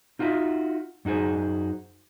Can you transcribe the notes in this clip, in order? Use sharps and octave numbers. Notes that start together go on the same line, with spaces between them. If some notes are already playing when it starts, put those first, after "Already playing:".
D#4 F4 F#4 A4 D#5 E5
F#2 D#4 F#4 G#4 C5